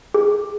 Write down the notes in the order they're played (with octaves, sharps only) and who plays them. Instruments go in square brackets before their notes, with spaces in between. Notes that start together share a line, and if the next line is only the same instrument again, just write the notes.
[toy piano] G#4